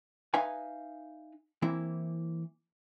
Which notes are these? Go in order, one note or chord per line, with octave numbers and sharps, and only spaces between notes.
D#4 B4 E5 F5 G#5
E3 A#3 C4 E4